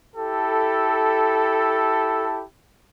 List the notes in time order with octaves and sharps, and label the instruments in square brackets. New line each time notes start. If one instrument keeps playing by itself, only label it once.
[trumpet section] E4 G4 A4